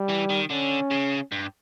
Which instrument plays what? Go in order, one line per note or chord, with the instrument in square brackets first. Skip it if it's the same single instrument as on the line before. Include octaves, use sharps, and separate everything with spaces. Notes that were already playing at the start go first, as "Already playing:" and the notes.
Already playing: [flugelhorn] G3
[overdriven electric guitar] E3
D#3
[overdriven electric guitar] D3 [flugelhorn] C#4
[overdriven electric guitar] C#3
G2